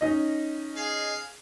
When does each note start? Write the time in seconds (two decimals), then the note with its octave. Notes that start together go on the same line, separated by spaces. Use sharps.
0.01 C#4 D#4 D#5
0.76 G#4 F5